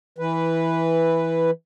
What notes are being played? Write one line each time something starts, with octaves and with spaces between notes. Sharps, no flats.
E3 B4